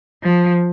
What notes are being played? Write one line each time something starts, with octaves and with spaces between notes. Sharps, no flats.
F3